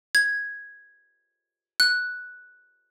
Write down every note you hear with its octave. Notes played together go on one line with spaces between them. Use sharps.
G#6
F#6